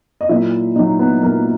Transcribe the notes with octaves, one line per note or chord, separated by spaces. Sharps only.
D#5
A#2 F#3 E4 E5
A#2 F#3 D#4 D#5
B3 B4
A#2 F#3 A#3 A#4